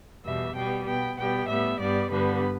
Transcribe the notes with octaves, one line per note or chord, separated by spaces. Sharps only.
E2 B2 G3 E5
B2 G3 B3 G5
B2 B3 G5
B2 G3 B3 G5
A2 G3 B3 E5
G2 G3 B3 D5
G2 D3 G3 B3 B4